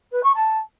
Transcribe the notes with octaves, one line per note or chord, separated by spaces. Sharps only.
B4
C#6
A5